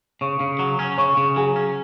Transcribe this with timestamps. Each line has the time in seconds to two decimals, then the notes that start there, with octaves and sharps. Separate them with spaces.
0.21 C#3 C#5 C#6
0.40 C#3
0.59 F#3
0.79 C#4
0.98 C#3 C#5 C#6
1.17 C#3
1.36 F#3 G#4 G#5
1.56 C#4